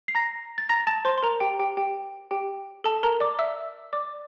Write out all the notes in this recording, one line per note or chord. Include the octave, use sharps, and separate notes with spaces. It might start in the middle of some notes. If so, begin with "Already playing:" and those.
C7
A#5 A#6
A6
A#5 A#6
A5 A6
C5 C6
C6
A#4 A#5
G4 G5
G4 G5
G4 G5
G4 G5
A4 A5
A#4 A#5
D5 D6
E5 E6
D5 D6